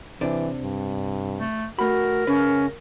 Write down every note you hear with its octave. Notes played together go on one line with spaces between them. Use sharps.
C3 E3 D4
G2
A3
A3 F#4 A#4 B5
C#3 C#4 B4